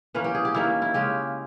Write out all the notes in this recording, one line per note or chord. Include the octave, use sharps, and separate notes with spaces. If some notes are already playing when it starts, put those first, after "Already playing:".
E3 A#3 C#4 B4
G4
G#4
G4
D#3 A#3 C#4 E4
E4
C#3 G#3 C#4 G4